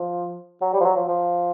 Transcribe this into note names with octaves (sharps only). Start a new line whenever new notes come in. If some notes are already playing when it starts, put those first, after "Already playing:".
Already playing: F3
F#3
G3
F3
F#3
F3
F3